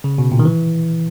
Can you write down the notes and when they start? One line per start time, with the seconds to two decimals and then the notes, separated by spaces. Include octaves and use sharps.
0.04 C#3
0.18 B2
0.32 A#2
0.39 D#3
0.45 E3